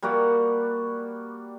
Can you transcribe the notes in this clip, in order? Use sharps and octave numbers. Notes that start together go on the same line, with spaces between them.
G3 A#3 F#4 D5